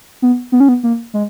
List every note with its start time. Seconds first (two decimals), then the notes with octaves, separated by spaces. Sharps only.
0.22 B3
0.52 B3
0.60 C#4
0.68 B3
0.83 A#3
1.14 G#3